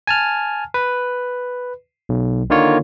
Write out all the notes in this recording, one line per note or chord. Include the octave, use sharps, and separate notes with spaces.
G#5 A5 F6
B4
B1
D3 D#3 A#3 F4 C#5